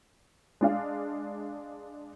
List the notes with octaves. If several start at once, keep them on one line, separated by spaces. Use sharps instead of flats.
G#3 D4 F5